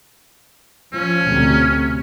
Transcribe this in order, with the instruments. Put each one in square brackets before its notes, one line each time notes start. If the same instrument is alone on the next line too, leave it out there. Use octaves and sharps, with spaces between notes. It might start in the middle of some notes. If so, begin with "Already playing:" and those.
[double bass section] F3 [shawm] C#4
[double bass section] D2 C3